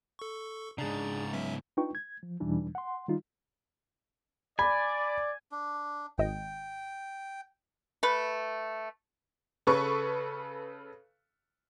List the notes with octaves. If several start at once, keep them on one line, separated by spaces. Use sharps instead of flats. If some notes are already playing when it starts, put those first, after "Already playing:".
A4 C#6
G#2 C#3 D4 G#4 A#5 A6
F#3 B3 C#4 E5
D4 D#4 F4 B4 G5 C#6
G#6
F3
E2 B2 E3 G3 D4 D#4
F#5 C6
D#3 G3 D#4 F4
D5 G#5 B5
D4
G#1 D#5 G5
A3 B4
C#3 A4 B4 C#6